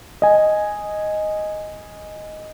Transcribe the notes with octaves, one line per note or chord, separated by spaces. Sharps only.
D#5 G#5